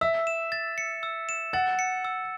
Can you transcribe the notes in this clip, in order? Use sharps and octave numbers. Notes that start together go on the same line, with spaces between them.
E5 E6
E7
A6
C#7
E6
E7
F#5 A6
C#7
E6